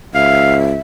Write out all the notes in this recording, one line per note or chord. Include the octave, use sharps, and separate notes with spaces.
C#2 E5 F5